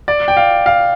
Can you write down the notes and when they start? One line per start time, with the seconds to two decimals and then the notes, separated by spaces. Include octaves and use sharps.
0.08 D5
0.28 G5
0.37 F5
0.66 F5